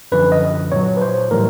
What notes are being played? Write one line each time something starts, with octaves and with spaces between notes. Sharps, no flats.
F#2 D3 F3 B4
D#5
A#2 F#3 C#5
B4
C5
A2 E3 G3 A#4